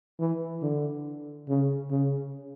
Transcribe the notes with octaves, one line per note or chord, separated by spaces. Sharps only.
E3
D3
C#3
C#3